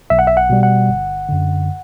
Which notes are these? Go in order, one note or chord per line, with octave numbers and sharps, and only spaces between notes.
B1 E5
F#5
E5
F#5
B2 G3
F#5
G1
F#2 D3